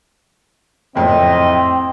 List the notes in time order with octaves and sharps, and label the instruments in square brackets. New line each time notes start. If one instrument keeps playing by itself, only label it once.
[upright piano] F#1 F2 A2 [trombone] C4 [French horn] D#5 [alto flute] G5